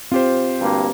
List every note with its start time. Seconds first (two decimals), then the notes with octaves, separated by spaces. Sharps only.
0.12 C4 F4 G4 C5
0.61 D2 G2 A#3